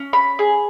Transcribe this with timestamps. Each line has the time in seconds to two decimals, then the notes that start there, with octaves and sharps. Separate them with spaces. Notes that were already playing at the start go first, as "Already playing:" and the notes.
Already playing: C#4
0.13 B5
0.39 G#4